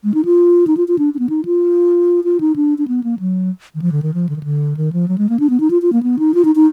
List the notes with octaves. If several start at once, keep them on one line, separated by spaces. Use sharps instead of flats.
G#3
D#4
F4
D#4
F4
F4
D4
D4
B3
D#4
F4
F4
D#4
D4
D4
B3
A#3
F#3
D#3
F3
D3
D#3
F3
D3
D#3
D3
D#3
F3
F#3
G#3
A#3
D4
B3
D#4
F4
F4
A#3
B3
D#4
F4
D#4
D#4